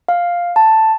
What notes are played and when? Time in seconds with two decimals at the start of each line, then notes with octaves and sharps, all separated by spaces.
0.09 F5
0.56 A5